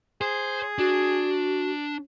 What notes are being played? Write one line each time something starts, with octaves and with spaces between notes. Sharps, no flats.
G#4 C5
D4 F#4